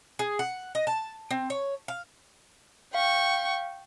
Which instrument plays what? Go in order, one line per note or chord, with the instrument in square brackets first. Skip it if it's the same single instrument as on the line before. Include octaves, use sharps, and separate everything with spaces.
[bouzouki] G#4
F#5
D#5
A5
C4
C#5
F5
[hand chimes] F5 [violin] G5 C#6